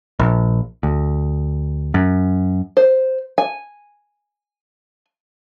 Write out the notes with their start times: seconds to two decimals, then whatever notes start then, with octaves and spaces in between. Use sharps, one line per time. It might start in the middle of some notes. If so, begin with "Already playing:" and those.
0.19 A#1
0.83 D2
1.94 F#2
2.77 C5
3.38 G#5